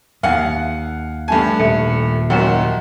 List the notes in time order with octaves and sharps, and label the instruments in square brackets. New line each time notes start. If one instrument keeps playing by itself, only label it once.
[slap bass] D#2 [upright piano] F5 F#5 G#5
[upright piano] G2 A3 G#5 [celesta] A5
[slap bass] D#1 [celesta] A4 E5 C#7
[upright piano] F#1 F#2 [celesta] F#5 G5 E7